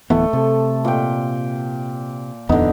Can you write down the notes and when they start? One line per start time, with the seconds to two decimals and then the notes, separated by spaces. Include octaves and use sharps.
0.10 D1 E3 A3 B3
0.33 C3 A4
0.85 A#2 G5
2.49 D#1 F2 D3 B3 D#4